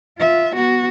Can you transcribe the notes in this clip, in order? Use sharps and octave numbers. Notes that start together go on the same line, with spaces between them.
F4 E5
B3 F#4